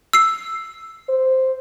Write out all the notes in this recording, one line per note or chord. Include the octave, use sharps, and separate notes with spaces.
E6 C7
C5